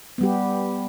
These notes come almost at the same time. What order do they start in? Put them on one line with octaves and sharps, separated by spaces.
B3 G3 G4